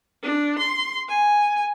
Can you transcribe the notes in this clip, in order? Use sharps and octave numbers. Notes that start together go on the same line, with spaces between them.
D4
C6
G#5